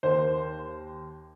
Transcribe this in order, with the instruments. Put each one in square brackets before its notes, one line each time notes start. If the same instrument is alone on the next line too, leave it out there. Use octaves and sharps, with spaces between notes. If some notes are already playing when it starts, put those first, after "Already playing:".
[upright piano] D#2 D#3 A#3 C5